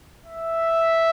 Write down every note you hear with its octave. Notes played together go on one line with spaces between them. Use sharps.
E5